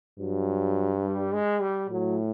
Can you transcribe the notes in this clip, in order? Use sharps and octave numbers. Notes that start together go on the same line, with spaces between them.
G2 F#3
G3
G#3
G3
A2 F#3